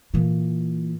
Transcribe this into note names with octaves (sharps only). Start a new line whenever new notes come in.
A#2 E3